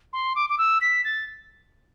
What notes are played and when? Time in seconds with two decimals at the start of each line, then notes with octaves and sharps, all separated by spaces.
0.13 C6
0.35 D6
0.50 D6
0.58 E6
0.81 B6
1.04 A6